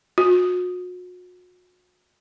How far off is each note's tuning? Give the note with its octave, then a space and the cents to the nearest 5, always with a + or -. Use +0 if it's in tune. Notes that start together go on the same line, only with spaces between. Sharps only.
F#4 -40